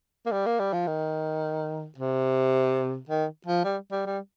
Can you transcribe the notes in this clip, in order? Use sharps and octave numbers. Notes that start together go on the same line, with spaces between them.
A#3
G3
A#3
G3
F3
D#3
C3
D#3
F3
G3
G3
G3